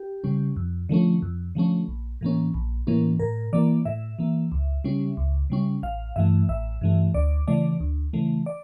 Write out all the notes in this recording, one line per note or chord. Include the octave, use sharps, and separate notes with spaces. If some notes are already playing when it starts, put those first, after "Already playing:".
Already playing: G4
C#3 G3 C#4
F2
D3 F3 A3 C#4
F2
D3 F3 A3 C#4
A#1
A2 E3 A#3 C#4
A#1
A2 E3 A#3 C#4
A2 A#4
E3 A#3 D5
A2 E5
E3 A#3
C#2
C#3 G3 C#4
C#2
C#3 G3 C#4
A1 F5
G2 E3 A3 E5
A1 E5
G2 E3 A3
D2 D5
C#3 E3 A3 D5
D2
C#3 E3 A3
D5